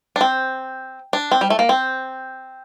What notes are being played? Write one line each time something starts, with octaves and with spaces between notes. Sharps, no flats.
D4
C4
D4
C4
G3
A3
A#3
C4